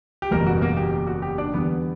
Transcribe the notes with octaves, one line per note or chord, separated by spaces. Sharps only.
G4
F#1 E2 B2 G3 A#3 A#4
F#4
A#3 A#4
G4
G4
F#4
G4
D4 D5
E2 D3 G3 B3 B4